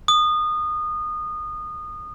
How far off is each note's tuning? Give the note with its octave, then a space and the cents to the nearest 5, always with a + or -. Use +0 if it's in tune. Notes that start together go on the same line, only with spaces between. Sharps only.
D#6 -25